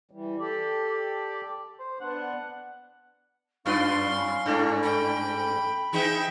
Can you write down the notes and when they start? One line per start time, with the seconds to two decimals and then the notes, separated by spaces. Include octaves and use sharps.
0.11 E3 G3
0.39 G4 A4 D5
0.88 D5
1.80 C5
2.01 B3 D4 F#5
3.66 F#2 B3 D4 F4 F5 C6 C#6
4.09 C#4
4.46 G2 A3 D4
4.83 G5 B5
5.93 E3 D#4 G#4 E5 G5